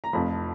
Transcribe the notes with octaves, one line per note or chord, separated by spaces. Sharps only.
A#5
F1 F2 F3 B5